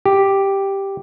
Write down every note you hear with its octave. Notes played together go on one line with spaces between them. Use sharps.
G4